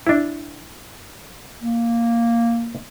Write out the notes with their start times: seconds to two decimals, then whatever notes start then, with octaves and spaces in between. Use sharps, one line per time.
0.07 D4 E4
1.62 A#3